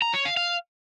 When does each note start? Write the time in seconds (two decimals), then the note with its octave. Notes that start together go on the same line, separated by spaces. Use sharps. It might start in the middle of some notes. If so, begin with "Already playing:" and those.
0.02 A#5
0.14 C#5
0.25 F5
0.37 F5